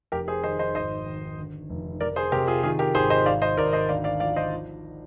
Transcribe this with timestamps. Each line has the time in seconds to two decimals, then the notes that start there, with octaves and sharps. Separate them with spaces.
0.12 F1 G4 A#4
0.28 G#4 C5
0.43 D#3 C5 D#5
0.59 C5 D#5
0.75 G#1 C5 D#5
1.06 D#3
1.38 D3
1.70 F1
2.00 F1 A#4 D5
2.16 G#4 C5
2.32 C3 G4 A#4
2.47 F4 G#4
2.63 D#3 F4 G#4
2.79 G4 A#4
2.95 G#1 G#4 C5
3.10 C5 D#5
3.26 G#1 D5 F5
3.42 C5 D#5
3.57 G#1 A#4 D5
3.73 C5 D#5
3.89 D2 D5 F5
4.04 D5 F5
4.20 F3 D5 F5
4.36 C5 D#5
4.51 F3